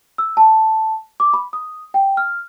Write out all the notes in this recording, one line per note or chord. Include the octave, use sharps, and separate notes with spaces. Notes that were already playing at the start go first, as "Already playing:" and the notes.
E6
A5
D6
B5
D#6
G5
F6